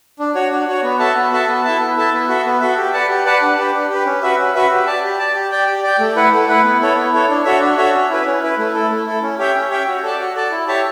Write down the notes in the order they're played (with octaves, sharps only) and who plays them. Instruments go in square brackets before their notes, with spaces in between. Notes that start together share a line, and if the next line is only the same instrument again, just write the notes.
[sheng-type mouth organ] D4
F#4 C#5
D4
F#4 C#5
B3
F#4 A4 E5 A5
B3
F#4 A4 E5 A5
B3
E4 A4 E5 A5
B3
E4 A4 E5 A5
B3
F#4 A4 E5
B3
F#4 A4 E5
G4
B4 D5 F#5 A5
G4
B4 D5 F#5 A5
D4
G4 B4
D4
G4 B4
C#4
F#4 B4 E5
C#4
F#4 B4 E5
G4
D5 A5
G4
D5 A5
G4
D5 G5
G4
D5 G5
A3
E4 B4 F#5
A3
E4 B4 F#5
B3
E4 A4 C#5
B3
E4 A4 C#5
D4
F#4 A4 C#5 E5
D4
F#4 A4 C#5 E5
C#4
E4 B4
C#4
E4 B4
A3
E4 A4
A3
E4 A4
C#4
G4 C#5 E5 G5
C#4
G4 C#5 E5 G5
F#4
A4 D5 A5
F#4
A4 D5 A5
E4
G4 C#5 E5 A5